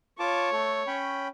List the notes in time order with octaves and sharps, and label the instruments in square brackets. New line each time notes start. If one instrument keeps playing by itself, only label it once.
[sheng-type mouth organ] F4 A5 D6 [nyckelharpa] C#5
[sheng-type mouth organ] A3 A4
C#4 G5 B5